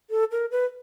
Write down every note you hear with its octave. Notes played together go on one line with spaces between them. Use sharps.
A4
A#4
B4